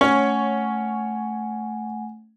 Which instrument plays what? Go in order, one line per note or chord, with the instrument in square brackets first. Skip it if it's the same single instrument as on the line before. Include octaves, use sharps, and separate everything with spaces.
[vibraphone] A3 F#5 G#5 [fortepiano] C#4 [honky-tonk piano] C#5